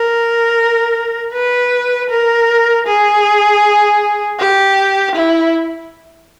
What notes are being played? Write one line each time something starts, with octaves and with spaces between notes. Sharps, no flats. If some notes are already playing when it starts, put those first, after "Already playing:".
Already playing: A#4
B4
A#4
G#4
G4
E4